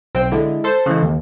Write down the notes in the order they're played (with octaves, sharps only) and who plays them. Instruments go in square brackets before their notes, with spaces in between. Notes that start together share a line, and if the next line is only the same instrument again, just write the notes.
[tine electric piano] B1 [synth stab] C4 G5
[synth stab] D3 [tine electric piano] G#3 E4
[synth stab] A4 C5
[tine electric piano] C#3 E3 G#3
D#2